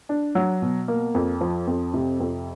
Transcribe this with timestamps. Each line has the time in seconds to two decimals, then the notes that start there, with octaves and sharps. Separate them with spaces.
0.09 D4
0.35 F#3
0.62 B2
0.88 A#3
1.15 F2
1.41 F3
1.67 F2
1.94 C3
2.20 F2